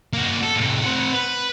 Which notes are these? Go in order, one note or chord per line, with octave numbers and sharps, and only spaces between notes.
A#3 F#4
A4
A2 C3
C4 F#5
B4